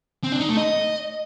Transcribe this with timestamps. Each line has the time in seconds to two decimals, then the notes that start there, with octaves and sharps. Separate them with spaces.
0.24 C4
0.32 D4
0.40 D#4
0.49 A3
0.57 D#5